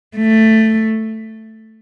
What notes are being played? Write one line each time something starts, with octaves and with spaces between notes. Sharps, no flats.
A3